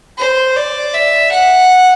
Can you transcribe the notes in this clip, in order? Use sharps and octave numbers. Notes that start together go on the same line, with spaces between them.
C5
D5
E5
F#5